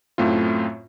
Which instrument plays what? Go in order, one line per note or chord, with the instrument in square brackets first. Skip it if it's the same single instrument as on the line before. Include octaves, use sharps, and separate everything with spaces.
[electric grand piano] F#2 A2 A3 C4 F4